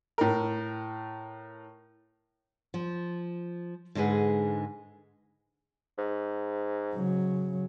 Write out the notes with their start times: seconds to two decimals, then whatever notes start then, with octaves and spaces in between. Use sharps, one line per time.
0.18 A2 A#4
2.74 F3
3.95 G#2 D3 G#3 G#4 B4
5.98 G#2
6.95 C#3 F#3